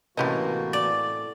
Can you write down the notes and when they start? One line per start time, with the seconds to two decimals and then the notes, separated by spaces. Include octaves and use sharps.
0.17 A2 C3 E3 A#3 C#4 F#4 G4 D#5
0.73 D5